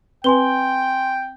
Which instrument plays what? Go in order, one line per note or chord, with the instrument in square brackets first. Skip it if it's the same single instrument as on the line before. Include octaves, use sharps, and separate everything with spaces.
[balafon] C4 B4 [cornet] G5 [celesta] G#5 C6 G7